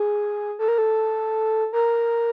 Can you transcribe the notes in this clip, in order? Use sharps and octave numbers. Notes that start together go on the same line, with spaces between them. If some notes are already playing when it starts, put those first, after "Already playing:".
Already playing: G#4
A4
A#4
A4
A#4